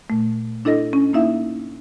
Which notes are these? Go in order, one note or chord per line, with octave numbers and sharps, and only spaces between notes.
A#2 A3
D4 E4 A4 D#5 A#6
C#4
A#3 D#4 E4 E5 F5